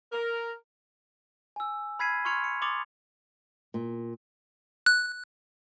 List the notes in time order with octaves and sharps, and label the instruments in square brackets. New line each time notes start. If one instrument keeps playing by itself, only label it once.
[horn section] A#4
[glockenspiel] G#5 E6
B5 F6 G#6 B6 C7 D#7
C6 C#6 F6 G#6 C#7 F7
C#7
C6 D6 D#6 A6 C#7 F7
[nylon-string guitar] A#2
[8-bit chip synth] F#6